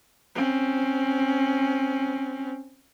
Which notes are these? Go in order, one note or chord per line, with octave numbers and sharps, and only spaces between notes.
C4 C#4